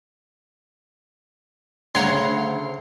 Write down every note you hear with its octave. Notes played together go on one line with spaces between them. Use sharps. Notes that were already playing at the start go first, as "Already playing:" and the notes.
D2 C#3 C#5 F#5 A#5 C6